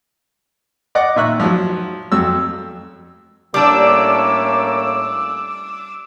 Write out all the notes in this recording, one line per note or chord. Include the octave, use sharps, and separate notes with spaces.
D5 D#5 F#5 D6
A#2 D#3 E5 C#6 F#6
F3 F#3
F2 F#3 E6
A2 G3 A#3 C#4 D4 D6 E6